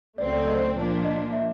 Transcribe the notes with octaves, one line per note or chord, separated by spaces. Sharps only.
C#2 C#3 F#3 A3 C4 D5
D5
D#5
A#2 F3 A#3 D4
D#5
E5